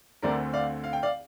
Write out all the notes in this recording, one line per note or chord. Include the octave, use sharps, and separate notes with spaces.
D2 D3 A3 C4 A#4 D5
D5 F5
F5
G5
D5 F5